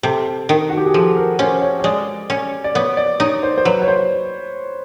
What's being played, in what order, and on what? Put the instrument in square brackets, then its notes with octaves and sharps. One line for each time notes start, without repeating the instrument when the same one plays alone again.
[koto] C3 [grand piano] A4
[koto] D#3
[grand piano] F#4
G4
G#4
[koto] F3 [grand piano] A4
[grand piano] A#4
[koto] C#4 [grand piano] C5
[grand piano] C#5
C#5
[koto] G#3 [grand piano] D5
[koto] C#4
[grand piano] D5
[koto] B3 [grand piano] C#5
[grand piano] D5
[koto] D#4 [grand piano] C#5
[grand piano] C5
C5
[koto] F#3 [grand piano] B4
[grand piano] C#5
C5